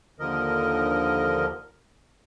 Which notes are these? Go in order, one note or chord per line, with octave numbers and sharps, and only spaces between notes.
D#2 D3 F3 A#4 D#5